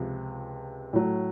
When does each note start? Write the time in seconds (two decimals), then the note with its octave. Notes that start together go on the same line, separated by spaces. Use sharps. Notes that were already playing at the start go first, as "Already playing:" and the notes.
Already playing: C#2 C3 F3
0.93 A2 F#3 A3